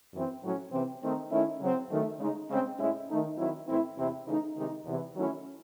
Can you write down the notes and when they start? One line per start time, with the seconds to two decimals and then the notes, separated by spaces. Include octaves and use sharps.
0.12 F#2 E3 C4
0.42 A2 F#3 C#4
0.71 C3 E3 C4
1.01 D#3 A3 C4 D#4
1.31 D#3 A3 C#4 E4
1.60 C#3 F#3 C4
1.89 F#2 D#3 A3
2.19 C#3 G#3 D#4
2.49 C#3 G#3 C4
2.78 A2 G#3 C#4 E4
3.08 D#3 A3 D#4
3.37 D#3 F#3 C4 E4
3.67 A2 E3 A3 C4 E4
3.96 E2 C3 E3 C4 E4
4.26 C#3 E3 A3 D#4
4.55 C3 D#3 G#3 D#4
4.85 E2 C3 E3
5.15 D#3 F#3 A3 C#4 E4